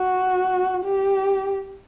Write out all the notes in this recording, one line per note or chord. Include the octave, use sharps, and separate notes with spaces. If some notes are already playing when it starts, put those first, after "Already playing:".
Already playing: F#4
G4